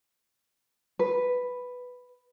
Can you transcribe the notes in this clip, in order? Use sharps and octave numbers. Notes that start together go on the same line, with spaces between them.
B4